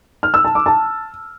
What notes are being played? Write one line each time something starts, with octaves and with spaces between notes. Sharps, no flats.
F6
E6
A5
D6
A5